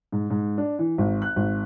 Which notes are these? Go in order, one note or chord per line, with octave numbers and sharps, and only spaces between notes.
G#2
G#2
D4
E3
G#1
F#6
G#1